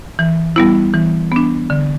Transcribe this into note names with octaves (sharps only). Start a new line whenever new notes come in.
E3
G3 B3 E4
E3
B3 D4
D3